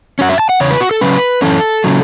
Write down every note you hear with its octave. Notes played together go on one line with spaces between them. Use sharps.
F#2 F#3 C#4 F#5
E5
A5
F#5
E2 C#3 C#5
B4
F#4
A4
C#3 F#3 C#4 B4
F#2 E3 C#4 A4
C#3 F#3